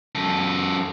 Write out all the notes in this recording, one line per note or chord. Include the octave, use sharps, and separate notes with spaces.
F#2 A4